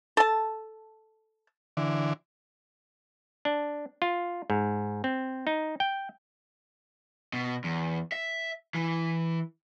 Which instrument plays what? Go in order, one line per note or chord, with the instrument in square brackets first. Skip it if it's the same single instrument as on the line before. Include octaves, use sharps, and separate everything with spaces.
[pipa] A4 A5
[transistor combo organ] D3 E3
[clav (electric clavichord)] D4
F4
G#2
C4
D#4
G5
[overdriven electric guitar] B2
E2
E5
E3